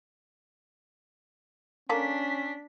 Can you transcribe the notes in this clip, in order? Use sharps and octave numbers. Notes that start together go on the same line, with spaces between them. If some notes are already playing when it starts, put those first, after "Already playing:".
A#3 C#4 D4 A4 B6